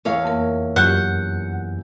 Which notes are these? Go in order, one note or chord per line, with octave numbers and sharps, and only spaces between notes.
E2 C#5 F5
F2 A#3 A#4
F#2 C#4 F4 G4 F#5 G6